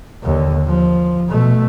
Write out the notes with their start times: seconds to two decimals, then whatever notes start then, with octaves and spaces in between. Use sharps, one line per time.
0.23 D#2 D3
0.66 F3
1.29 B2 A3